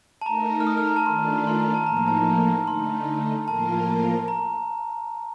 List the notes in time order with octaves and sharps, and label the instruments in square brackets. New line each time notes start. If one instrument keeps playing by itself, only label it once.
[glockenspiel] A5
[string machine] A3 D#4 A#4 [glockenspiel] A#5
[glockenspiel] F6
D#6
F6
A#5
A5
[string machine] D#3 A3 D4 F4 [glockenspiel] C6
[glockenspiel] C6
A#5
A5
[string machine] A2 F3 A#3 D#4 [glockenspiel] A#5
[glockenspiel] A#5
A5
A#5
[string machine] D3 A3 D#4 [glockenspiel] C6
[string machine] A2 F3 A#3 F4 A#4 [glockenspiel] A5
[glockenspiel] A#5